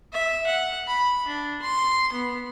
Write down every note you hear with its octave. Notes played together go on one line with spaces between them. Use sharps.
E5
F#5
B5
D4
C6
B3